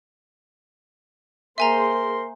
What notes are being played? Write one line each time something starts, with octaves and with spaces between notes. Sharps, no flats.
A#3 G#4 A#4 C5 E5 G#5 A#5 C6